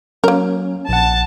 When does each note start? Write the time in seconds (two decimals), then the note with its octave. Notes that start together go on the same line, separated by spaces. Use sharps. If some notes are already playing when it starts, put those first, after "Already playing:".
0.24 F#3 A#3 C#4 A#4
0.89 A#1 F#5 A5